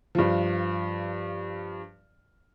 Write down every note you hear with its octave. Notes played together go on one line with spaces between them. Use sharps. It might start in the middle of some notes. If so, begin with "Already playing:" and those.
G2 F3